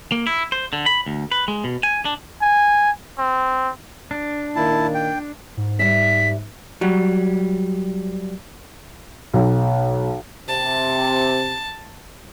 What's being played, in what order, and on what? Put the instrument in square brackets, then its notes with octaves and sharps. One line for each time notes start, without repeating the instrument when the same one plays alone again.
[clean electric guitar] A#3
E4
C5
D3
B5
D2
B4
G#3
B2
G#5
D4
[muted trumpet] G#5
C4
[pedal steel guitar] D4
[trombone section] A#2 D#3 A#3 [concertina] E4 A5
[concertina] G5
[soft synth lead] G#2
[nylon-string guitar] G3 E5 [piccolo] B6
[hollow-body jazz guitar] F#3 G3
[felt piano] B1
[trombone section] C3 [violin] A5